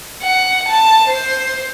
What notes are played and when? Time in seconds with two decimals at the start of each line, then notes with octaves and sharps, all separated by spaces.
0.23 F#5
0.69 A5
1.09 C5